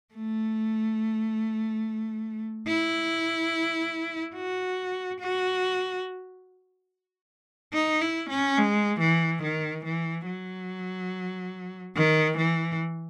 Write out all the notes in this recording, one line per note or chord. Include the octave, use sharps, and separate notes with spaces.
A3
E4
F#4
F#4
D#4
E4
C#4
G#3
E3
D#3
E3
F#3
D#3
E3